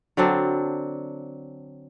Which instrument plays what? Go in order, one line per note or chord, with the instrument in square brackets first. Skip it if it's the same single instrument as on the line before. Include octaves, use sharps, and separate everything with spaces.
[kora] D3 F#3 C4 D4